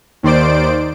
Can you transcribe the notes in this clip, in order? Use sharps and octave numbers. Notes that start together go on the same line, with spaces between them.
D#2 D#3 C5 D5 D7